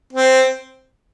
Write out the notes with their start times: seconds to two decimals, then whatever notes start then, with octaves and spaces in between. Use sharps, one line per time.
0.13 C4